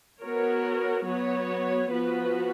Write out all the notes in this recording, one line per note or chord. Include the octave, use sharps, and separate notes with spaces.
B3 F#4 A#4 C#5
F#3 B3 F#4 C#5
F3 B3 F#4 B4